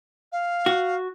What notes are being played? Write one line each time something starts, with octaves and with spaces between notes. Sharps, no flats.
F5
F#4